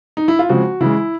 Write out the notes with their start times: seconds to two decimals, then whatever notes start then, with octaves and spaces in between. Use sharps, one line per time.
0.17 D#4
0.28 E4
0.39 F4
0.49 C#3 F3 G#3 C4 F#4
0.81 C#3 E3 G#3 E4